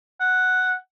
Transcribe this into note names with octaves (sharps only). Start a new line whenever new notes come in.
F#5